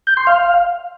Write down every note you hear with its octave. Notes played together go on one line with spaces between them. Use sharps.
G6
C6
F5